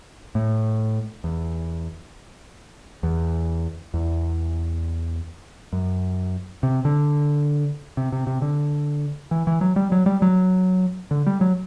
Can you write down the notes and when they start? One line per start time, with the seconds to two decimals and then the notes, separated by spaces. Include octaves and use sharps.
0.35 A2
1.24 E2
3.03 E2
3.94 E2
5.73 F#2
6.63 C3
6.85 D3
7.97 C3
8.12 C3
8.27 C3
8.42 D3
9.31 E3
9.47 E3
9.61 F#3
9.76 G3
9.92 F#3
10.06 G3
10.22 F#3
11.11 D3
11.27 G3
11.41 F#3